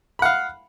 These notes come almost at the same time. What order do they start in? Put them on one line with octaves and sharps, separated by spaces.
B5 F#5 F5